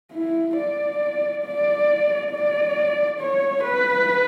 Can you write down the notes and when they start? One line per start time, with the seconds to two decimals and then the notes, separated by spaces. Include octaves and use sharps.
0.13 E4
0.57 D5
1.45 D5
2.32 D5
3.20 C#5
3.63 B4